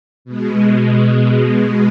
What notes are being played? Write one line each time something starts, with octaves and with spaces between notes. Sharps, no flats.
B2 G#3